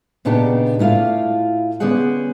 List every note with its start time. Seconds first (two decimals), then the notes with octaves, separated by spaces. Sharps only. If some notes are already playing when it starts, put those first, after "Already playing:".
0.25 A#2 C#3 B3 D4 D#4 G4
0.79 A2 E4 F4 D5 F5
1.80 D3 B3 C#4 G4 G#4 F#5